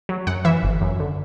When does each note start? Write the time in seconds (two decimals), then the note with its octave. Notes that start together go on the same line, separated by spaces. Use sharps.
0.09 F#3
0.27 F#2 F#5
0.45 E3 E5
0.63 G1
0.81 F#2
1.00 D3